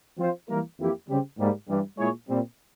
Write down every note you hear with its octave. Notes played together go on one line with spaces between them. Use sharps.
F3 C4 F4 C5
E3 G3 A#3 E4 A#4
F2 E3 A#3 E4 G4
C#3 G3 C4 G4
G#2 G3 A#3
G2 E3 G3
A#2 G#3 E4 G#4 C#5
A#2 G3 C4